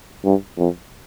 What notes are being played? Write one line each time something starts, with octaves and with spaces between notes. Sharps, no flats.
G2
F2